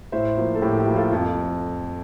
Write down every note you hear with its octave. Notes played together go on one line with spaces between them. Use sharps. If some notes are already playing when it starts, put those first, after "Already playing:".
A2 C5 E5
F3 A#3
A4
A2 E4 G4
E4 G4
F3 A#3
F4 A4
F2 F4